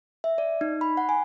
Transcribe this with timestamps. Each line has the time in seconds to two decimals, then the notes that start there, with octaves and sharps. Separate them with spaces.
0.24 E5
0.38 D5
0.61 D#4
0.81 B5
0.97 F#5
1.09 G#5